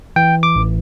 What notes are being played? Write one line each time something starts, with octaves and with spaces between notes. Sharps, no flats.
E3 G5
D6
A1